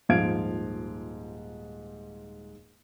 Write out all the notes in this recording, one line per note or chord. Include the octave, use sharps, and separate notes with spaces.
D#1 G#2 F3 F5 G#6 D7